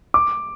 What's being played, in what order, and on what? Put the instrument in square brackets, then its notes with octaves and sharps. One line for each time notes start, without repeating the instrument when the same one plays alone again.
[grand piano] D6